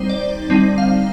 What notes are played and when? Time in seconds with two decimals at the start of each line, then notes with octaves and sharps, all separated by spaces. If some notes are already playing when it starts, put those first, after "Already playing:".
Already playing: G3 C4 D#4 C5
0.09 D5
0.50 D3 G3 C4 D#4
0.78 F5